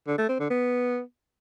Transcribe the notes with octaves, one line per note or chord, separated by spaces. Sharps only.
D3
A3
C4
D3
B3